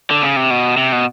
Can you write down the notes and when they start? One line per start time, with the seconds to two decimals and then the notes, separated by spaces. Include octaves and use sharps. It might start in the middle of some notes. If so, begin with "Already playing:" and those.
0.11 D3
0.23 C#3
0.36 C3
0.51 B2
0.77 C3
0.92 B2